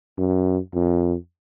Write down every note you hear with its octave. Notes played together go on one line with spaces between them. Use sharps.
F#2
F2